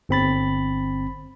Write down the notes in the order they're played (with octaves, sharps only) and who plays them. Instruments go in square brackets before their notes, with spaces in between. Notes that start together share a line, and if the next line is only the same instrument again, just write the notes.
[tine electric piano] G1 C4 B5 A6